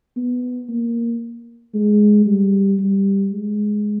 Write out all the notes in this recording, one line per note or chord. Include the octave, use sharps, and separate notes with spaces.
B3
A#3
G#3
G3
G3
G#3